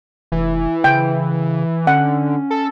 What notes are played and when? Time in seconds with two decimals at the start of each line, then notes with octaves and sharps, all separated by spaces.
0.32 F1 E3
0.84 C#3 G5
1.87 D3 C#4 F#5
2.50 A4